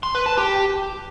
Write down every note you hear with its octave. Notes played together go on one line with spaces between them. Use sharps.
C6
B4
A5
G4